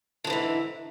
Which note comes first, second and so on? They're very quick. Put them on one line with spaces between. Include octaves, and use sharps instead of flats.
D3 F3 E3 G#2